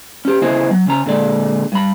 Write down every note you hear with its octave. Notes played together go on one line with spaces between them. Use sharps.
C#4 G4
C#3 B3 E4 C5 D#5
F#3
C#3 C#4 A#5
A#2 D3 G#3 D5
G2 B5